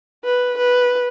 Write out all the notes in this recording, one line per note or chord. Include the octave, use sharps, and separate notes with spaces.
B4
B4